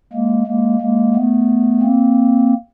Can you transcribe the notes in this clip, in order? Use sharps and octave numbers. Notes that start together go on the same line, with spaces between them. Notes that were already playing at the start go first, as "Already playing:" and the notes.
G#3 A#3
G#3 A#3
G#3 A#3
A3 B3
A#3 C4